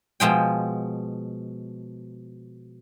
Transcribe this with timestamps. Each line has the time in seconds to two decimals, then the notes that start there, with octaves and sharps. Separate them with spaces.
0.20 B2 F3 G#3 G5